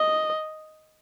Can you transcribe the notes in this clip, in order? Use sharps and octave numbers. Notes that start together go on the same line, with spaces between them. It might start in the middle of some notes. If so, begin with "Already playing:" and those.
Already playing: D#5